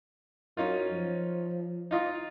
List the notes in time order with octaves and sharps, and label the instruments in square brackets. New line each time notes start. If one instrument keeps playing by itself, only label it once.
[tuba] F#2 [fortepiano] C#4 D#4 F4
[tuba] F3
[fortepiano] D#4 F4 D#5